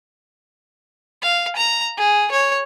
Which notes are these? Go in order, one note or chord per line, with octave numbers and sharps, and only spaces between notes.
F5
A#5
G#4
C#5